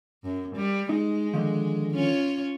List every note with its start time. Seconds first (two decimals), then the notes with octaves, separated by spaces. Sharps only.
0.24 F#2
0.56 G3
0.89 G#3 D#4
1.34 D3 D#3 F3
1.94 C#4 F4 C#5